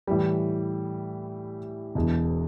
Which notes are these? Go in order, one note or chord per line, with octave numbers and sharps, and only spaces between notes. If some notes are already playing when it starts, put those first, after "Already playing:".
A2 E3 G3
E1 E2 B2